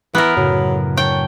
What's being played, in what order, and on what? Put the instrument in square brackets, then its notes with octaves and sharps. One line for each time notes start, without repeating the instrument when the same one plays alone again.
[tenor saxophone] E3 [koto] B3 A#4
[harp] F#2 A2 C#3 [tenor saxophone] F#3
[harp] D4 [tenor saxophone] C#5 [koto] G5